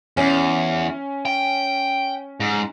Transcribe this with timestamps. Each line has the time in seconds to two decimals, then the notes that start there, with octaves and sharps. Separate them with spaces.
0.17 E2 C#4
1.25 G5
2.40 G#2